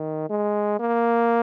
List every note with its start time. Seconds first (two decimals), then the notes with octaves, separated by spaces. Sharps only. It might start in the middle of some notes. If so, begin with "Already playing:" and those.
Already playing: D#3
0.30 G#3
0.80 A#3